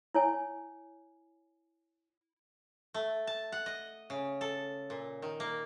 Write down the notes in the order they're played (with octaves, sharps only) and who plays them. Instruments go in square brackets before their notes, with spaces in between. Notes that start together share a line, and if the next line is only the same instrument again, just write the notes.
[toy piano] E4 C#5 G#5
[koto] A3
A5
F#5
D#5
C#3
A4
A#2
D#3
A#3